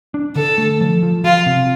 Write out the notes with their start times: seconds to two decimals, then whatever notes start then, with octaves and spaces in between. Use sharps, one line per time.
0.14 D4
0.36 D3 A4
0.58 A3
0.81 F3
1.03 F3
1.24 F3 F4
1.46 C3